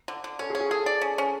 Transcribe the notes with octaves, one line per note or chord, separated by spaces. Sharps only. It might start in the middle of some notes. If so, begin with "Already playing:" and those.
D3
D3
C#4 A4
G#4
C#4
G#4
G#4 A4
D5
C#4
C#4